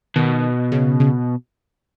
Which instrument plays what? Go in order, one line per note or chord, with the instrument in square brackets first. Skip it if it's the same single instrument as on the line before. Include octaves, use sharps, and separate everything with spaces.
[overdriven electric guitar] B2 [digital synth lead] D#3
[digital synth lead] C#3
C#3